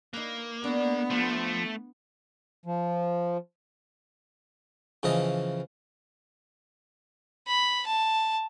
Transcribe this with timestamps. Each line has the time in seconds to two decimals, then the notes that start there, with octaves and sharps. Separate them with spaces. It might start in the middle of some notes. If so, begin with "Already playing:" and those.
0.14 A#3 D#4 B4
0.64 B3 D4 F#4 A4
1.10 F3 A3 C5
2.66 F3
5.03 C#3 E3 F3 D#5
7.48 B5
7.87 A5